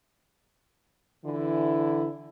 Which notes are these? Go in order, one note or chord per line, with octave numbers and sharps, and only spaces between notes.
D3 E3 E4